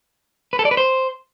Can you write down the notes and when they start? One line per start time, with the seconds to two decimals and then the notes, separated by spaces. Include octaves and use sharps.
0.53 B4
0.59 A4
0.65 D5
0.71 B4
0.77 C5